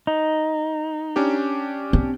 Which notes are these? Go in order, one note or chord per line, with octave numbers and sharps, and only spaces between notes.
D#4
C#4 D4 G4
C4